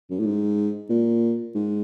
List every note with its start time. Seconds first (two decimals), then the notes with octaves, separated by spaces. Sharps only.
0.10 F#2
0.19 A2
0.26 G#2
0.89 A#2
1.54 G#2